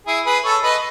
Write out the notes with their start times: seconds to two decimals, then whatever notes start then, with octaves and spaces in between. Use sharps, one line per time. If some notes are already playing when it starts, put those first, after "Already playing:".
0.07 E4 G#4
0.26 G#4 B4
0.44 A4 C#5
0.63 B4 D#5